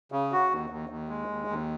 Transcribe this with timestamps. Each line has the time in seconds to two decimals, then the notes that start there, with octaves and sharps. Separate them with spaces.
0.12 C#3
0.32 F#4
0.51 D#2
0.70 D#2
0.89 D#2
1.09 G#3
1.28 D#2
1.47 D#2